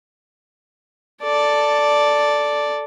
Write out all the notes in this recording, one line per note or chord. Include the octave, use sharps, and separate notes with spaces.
A4 D5